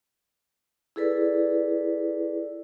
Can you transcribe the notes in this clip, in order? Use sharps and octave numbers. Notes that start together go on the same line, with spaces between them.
E4 G#4 A4 B4 D5